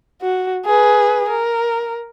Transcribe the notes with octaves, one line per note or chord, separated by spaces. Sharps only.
F#4
G#4 B4
A#4